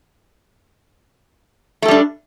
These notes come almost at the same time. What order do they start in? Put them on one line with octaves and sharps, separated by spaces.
A3 A4 G3 D4